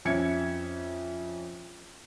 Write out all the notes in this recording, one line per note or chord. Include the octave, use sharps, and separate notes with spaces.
F2 C#4 E5 G#6 C#7